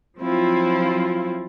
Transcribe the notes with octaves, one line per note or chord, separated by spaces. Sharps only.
F3 F#3 C4 E4 F4